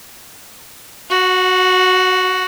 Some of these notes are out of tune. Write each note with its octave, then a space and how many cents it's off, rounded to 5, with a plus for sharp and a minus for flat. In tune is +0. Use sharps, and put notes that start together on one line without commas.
F#4 +0 F#5 -35